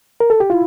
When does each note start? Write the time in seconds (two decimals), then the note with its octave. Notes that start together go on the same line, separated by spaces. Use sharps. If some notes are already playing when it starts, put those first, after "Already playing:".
0.20 A#4
0.30 A4
0.40 G4
0.50 E4 F4